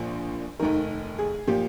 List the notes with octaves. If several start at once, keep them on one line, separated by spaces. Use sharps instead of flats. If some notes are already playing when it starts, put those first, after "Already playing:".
Already playing: A#1 A#2 F3
F1 D#2 D#3 A#4
G#4
A#2 F3 G4